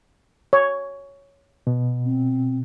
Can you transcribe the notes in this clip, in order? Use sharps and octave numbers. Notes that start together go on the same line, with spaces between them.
C#5
B2
C4